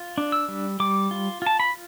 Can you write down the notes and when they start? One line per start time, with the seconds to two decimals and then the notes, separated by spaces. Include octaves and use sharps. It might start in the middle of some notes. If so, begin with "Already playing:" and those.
Already playing: F4
0.18 D4
0.32 E6
0.48 G3
0.80 G3 D6
1.11 F4
1.42 F4 A5
1.60 B5